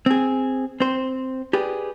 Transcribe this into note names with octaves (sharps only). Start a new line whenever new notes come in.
C4 G#4
C4 C5
G4 G#4 B4 D5